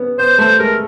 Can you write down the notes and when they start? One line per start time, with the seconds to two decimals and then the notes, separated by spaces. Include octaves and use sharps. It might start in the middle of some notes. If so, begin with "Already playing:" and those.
Already playing: B3 C#4
0.19 B3 C5
0.38 A3 C5
0.59 G#3 A#4